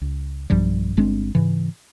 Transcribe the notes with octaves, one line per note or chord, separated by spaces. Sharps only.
C#2
B1 G2 F3 G3
G1 G#3 C4 D4
G#2 C#3 E3